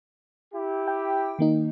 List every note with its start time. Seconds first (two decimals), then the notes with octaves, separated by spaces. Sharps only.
0.53 E4 G4
0.88 G5
1.39 D#3 A#3 D#4